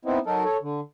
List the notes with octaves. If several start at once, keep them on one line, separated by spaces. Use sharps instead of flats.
B3 C4 D#4 E4
F#3 D#4 A4 A#4
A4 C#5
D3